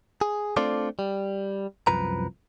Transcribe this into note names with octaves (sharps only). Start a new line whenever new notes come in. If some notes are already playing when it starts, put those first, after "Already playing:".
G#4
A3 C4 D4 F4 A4 D5
G3
C2 F#2 F3 B4 A#5